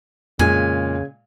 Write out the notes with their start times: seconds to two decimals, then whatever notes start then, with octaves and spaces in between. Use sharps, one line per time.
0.39 F2 A#2 C#3 G#3 G#5